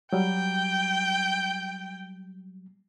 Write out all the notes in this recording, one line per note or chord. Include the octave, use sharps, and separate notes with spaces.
F#3 G3 G5